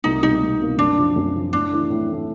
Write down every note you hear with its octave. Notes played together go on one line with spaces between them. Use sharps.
C2 D#4
B2 G3 A#3 D#4
C2
B2 G3 A#3
F#2 D4
C#3 F3
F#2
C#3 F3
A2 D4
E3 A3
A2
E3 A3